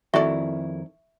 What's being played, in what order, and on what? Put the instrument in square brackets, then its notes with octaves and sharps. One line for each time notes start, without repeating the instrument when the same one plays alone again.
[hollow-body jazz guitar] F2 D#3 E4 [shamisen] F#4 A4 D5 [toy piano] E5 C#6